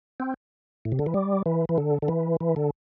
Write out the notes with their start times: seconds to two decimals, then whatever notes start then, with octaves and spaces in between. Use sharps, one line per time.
0.20 C4
0.85 A2
0.92 C3
0.99 D3
1.06 E3
1.14 G3
1.46 E3
1.69 E3
1.78 D3
2.02 D3
2.08 E3
2.40 E3
2.56 D3